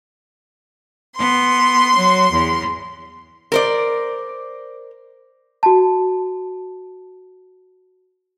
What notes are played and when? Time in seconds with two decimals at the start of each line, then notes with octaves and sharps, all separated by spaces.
1.18 B3 C6
1.96 F#3
2.32 E2
3.52 A#4 C5 D5
5.63 F#4 A5